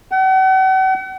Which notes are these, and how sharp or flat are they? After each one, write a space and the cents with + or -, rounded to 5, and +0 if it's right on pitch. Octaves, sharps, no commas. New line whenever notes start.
F#5 +40